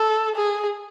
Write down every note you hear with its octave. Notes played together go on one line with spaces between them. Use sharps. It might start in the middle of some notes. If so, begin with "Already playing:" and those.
Already playing: A4
G#4